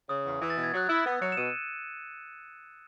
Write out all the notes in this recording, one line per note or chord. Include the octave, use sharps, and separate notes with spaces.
C#3 D#6
E2
E3
A6
B2
G#6
F#3 F#6
E4 E6
B3
F#3 C#7
E7
B2 D#7